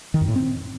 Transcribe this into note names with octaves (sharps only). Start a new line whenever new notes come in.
D#3
F#2
A2
C4